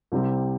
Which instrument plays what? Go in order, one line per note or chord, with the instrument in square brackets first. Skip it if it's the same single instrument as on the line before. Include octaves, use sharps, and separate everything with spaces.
[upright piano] C2 C3 G3 C4